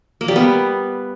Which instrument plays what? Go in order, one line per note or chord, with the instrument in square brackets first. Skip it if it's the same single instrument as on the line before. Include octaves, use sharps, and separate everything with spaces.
[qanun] A#3
G3
B3